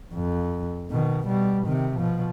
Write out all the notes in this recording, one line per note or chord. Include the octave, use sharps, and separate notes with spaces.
F2
B2 D#3
B2 G3
C3 D#3
B2 F3